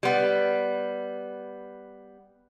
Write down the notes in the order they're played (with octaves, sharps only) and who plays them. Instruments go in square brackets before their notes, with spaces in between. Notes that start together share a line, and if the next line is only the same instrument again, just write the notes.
[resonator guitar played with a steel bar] G3 B3